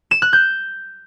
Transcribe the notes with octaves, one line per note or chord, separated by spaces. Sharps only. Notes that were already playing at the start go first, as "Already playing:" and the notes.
E7
F#6
G6